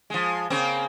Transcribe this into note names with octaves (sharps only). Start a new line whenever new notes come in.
F3 G#3
C#3 A#3 C4